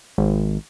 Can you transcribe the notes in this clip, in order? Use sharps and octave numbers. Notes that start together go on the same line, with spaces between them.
G#1